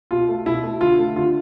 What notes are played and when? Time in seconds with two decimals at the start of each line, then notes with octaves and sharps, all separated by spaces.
0.11 B2 F4
0.29 A3
0.46 B2 E4
0.64 A3
0.81 D3 F4
0.99 A3
1.16 D3 F4